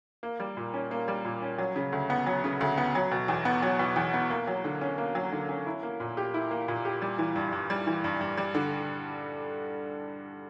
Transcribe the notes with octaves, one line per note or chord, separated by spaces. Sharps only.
A#3
G3
A#2
C#4
A#3
G3
A#2
C#4
F#3
C#3
D2
B3
F#3
C#3
D2
B3
F#3
B2
E2
B3
F#3
B2
E2
B3
A#3
F#3
D3
C#4
A#3
F#3
D3
C#4
E4
A#3
A#2
G4
E4
A#3
A#2
G4
G3
E3
G2
G2
G3
E3
G2
G2
G3
D3